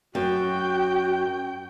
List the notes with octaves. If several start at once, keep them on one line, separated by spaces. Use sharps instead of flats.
F#2 F#4 G5